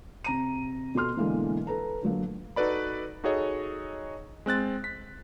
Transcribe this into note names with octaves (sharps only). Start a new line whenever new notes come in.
C3 A#5 D#7
B2 F#4 A4 C6 F6
B2 D3 E3 G#3 A#3
A4 B4 A#5
D3 F#3 A#3
D#4 F#4 A4 B4 D5 B5
D#4 F#4 G#4 A4 C#5 D#5
G#3 C4 F#6 A6
B6